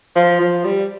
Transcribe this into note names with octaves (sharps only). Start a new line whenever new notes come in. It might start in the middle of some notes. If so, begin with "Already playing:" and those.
F3
F3
G3